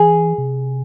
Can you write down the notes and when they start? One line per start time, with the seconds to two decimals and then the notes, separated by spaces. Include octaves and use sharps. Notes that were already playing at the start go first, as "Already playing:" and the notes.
Already playing: E3 G#4
0.38 C3